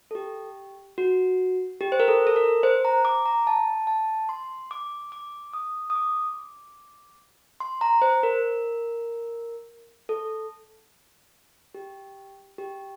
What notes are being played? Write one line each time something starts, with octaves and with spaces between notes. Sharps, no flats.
A4
G4
F#4
G4
C5
A#4
A4
A4
A#4
C5
A#5
D6
A#5
A5
A5
C6
D6
D6
D#6
D#6
D6
C6
A#5
C5
A#4
A4
G4
G4